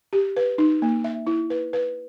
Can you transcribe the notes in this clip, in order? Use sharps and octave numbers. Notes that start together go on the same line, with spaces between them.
G4
B4
D#4
A#3
E5
E4
B4
B4